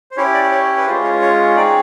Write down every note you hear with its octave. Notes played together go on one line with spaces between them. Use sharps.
C5
C#4 E4 G4 C#5
D5
C#5
B4
G#3 C#4 F4 G#4 C5
C#5
C#5
C4 D#4 G#4 D5